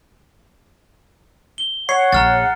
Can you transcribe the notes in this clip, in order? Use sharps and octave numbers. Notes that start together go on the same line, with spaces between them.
G7
C#5 F#5 C7
A#1 A#5 F6 A6